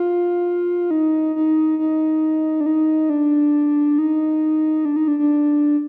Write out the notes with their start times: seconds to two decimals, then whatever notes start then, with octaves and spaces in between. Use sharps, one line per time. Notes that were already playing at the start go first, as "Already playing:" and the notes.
Already playing: F4
0.91 D#4
1.36 D#4
1.79 D#4
2.61 D4
2.66 D#4
3.10 D4
3.98 D#4
4.85 D4
4.96 D#4
5.08 D4
5.19 D4